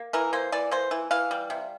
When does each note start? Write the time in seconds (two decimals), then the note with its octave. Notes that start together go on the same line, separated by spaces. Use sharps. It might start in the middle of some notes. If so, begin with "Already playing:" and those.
Already playing: A#3
0.13 E3 A#4
0.33 A#3 C5
0.52 E3 D5
0.71 A#3 C5
0.91 E3
1.11 E3 F5
1.31 G3
1.50 C3